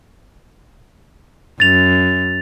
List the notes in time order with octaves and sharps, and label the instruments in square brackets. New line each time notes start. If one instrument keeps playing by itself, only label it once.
[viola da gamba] F#2 [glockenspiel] A6 F7